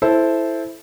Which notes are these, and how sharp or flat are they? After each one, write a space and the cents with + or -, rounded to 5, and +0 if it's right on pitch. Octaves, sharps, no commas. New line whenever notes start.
E4 +0 A4 -10 C5 +0